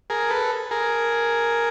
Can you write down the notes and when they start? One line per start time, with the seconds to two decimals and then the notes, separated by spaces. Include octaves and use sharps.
0.10 G#4 A#4
0.30 A4 B4
0.71 G#4 A#4